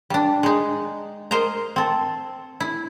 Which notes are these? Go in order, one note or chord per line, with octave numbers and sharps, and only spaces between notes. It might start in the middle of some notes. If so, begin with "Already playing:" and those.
G3 D4
G#3 D#4
A#4 C5 D#5 A#5
C4 A4
E4